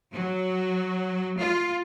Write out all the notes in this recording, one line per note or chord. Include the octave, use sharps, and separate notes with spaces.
F#3
F4